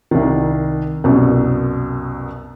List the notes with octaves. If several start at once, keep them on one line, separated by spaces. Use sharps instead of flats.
C2 D#3
C2 F#2 B2